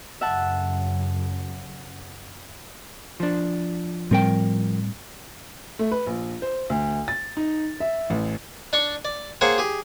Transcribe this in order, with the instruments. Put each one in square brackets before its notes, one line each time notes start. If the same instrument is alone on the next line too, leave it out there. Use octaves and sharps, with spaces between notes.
[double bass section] F#2 C#3 [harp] E5 F#5 A5
[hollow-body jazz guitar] F3 D4
[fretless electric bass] A2 G3 C4 [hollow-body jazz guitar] F3 A#4 G5
[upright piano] A3
B4
A#1
C5
D2
A6
D#4
E5
A1
[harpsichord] D4 D5 C#6
D5
A#3 G#4 C5 C#5 F#5 G5
G4 G#4